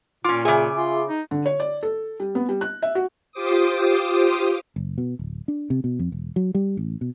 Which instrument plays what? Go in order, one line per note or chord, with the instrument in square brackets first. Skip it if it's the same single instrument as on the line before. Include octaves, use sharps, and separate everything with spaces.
[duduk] A#2 [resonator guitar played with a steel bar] C#4 F4 [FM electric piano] D6
[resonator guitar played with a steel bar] C#3 G#5 [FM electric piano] G#4 E5 D6
[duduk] F4
D#4
[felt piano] D3
C#5
D5
A4
G3
B3
G3
F#6
E5
F#4
[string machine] F4 G4 C5 D6 D#6
[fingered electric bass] F#1
B2
D1
D4
C3
B2
F2
E1
F#3
G3
A1
B2